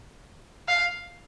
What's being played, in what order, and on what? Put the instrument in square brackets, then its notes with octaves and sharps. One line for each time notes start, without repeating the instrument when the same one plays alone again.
[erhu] F5